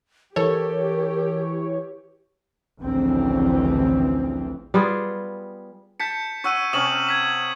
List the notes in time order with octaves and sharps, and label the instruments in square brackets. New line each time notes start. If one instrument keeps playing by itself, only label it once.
[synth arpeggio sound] E3 C#5 [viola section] G4 [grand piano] A4 [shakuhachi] A#4
[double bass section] A1 D2 C#3 E3 F3 C4
[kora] G3 B3 F4 G#4
[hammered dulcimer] A5 [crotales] G6 B6 C#7
[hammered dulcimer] C#5 F#5 [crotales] C#6 E6 D#7
[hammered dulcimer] C3 C#4 [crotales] D#6 E7 F#7
[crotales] G#6 B6 E7